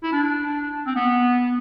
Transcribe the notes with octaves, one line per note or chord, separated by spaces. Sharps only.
E4
D4
C4
B3